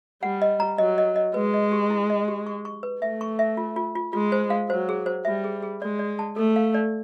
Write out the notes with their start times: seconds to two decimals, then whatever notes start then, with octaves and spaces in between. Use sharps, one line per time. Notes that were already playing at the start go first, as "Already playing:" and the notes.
0.23 G3 F#5
0.42 D#5
0.60 A#5
0.78 F#3 D#5
0.98 D#5
1.16 D#5
1.34 G#3 B4
1.54 D#5
1.72 G4
1.90 E4
2.10 D#5
2.28 G4
2.47 C#6
2.65 C#6
2.83 B4
3.02 A3 E5
3.21 C#6
3.39 E5
3.57 F4
3.76 F4
3.96 F4
4.13 G#3 F4
4.32 C5
4.50 F5
4.69 F#3 C5
4.89 G#4
5.06 C5
5.25 G3 E5
5.44 G#4
5.63 G#4
5.81 G#3 D5
5.99 D5
6.19 A5
6.36 A3 A4
6.56 F5
6.74 D5